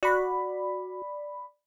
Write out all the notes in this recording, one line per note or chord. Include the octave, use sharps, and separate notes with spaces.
F#4 D5 B5